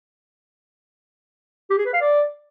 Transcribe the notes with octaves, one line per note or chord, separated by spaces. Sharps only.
G4
G#4
B4
F5
D5